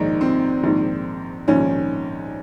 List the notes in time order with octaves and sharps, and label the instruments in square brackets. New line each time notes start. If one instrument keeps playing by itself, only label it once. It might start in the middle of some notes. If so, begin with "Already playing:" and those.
Already playing: [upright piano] A#1 G#2 D#3 D#4
C4
A#1 G#2 D#3
A#1 G#2 D#3 C#4